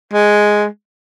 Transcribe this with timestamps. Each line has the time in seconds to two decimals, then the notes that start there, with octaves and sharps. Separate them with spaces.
0.13 G#3